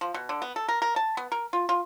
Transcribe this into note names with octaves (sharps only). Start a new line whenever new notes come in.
F3
B2
D3
B3
A4
A#4
A#4
A5
B3
A#4
F4
F4